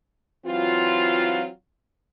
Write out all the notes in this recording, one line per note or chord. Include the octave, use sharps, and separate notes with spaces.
E3 F#3 C4 F4